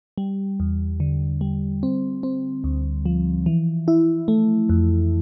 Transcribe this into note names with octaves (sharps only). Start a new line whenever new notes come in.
G3
E2
D3
G3
C4
C4
D2
F3
E3
E4
A3
F2